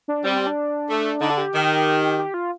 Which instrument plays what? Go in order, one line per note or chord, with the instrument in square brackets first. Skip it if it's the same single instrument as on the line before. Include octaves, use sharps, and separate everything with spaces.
[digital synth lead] D4
[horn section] G3 [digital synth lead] C4
[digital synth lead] C4
D4
[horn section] A3
[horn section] D3 [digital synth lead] D#4
[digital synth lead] A4
G4
[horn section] D#3
[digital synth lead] G4
F4